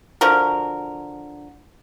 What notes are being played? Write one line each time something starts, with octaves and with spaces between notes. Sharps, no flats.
D3 F3 F#4 A#4